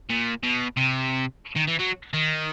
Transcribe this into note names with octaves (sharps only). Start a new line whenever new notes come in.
A#2
B2
C3
D#3
E3
F#3
D#3